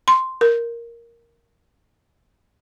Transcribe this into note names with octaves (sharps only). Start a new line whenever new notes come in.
C6
A#4